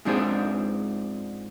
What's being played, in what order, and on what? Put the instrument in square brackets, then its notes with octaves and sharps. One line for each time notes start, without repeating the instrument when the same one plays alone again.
[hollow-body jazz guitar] G#2 F3 C4 D4 F#4 G#4